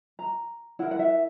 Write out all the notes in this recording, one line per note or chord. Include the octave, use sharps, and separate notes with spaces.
A#5
E4 A#4 F#5
F#5
E5